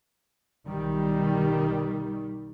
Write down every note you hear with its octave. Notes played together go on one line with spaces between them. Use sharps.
B1 D#3 G3